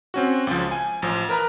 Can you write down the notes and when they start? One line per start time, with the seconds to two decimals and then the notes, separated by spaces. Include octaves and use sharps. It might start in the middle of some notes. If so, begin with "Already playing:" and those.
0.14 C4 C#4 F#4
0.47 C#2 F3
0.71 G#5
1.02 A1 F3
1.29 A#4 B4 A#5